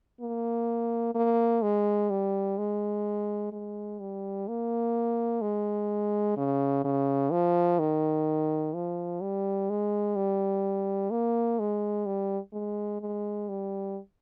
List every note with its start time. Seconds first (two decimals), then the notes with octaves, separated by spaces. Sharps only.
0.21 A#3
1.15 A#3
1.62 G#3
2.10 G3
2.58 G#3
3.52 G#3
4.00 G3
4.48 A#3
5.42 G#3
6.37 C#3
6.84 C#3
7.32 F3
7.79 D#3
8.75 F3
9.21 G3
9.70 G#3
10.16 G3
11.11 A#3
11.60 G#3
12.06 G3
12.53 G#3
13.01 G#3
13.49 G3